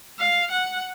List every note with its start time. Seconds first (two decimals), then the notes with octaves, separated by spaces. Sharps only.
0.19 F5
0.51 F#5